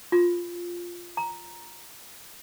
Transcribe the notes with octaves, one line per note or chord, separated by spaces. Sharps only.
F4
A#5